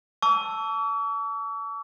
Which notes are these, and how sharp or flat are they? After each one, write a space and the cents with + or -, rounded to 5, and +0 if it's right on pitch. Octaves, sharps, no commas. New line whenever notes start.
A5 +0 C#6 +45 E6 +0